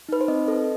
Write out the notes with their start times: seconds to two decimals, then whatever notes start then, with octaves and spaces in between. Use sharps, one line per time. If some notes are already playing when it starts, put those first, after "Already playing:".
0.09 D#4 B4
0.21 C5
0.28 C4 D#5
0.48 A4